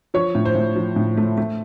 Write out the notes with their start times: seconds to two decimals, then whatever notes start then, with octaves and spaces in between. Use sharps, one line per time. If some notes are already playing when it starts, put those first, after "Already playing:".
0.14 F3 C#5
0.35 A2
0.45 C5
0.55 A2
0.76 F3
0.96 A2
1.17 A3
1.37 A3